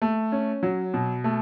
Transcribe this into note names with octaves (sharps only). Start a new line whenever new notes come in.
A3
C#4
F#3
B2
A3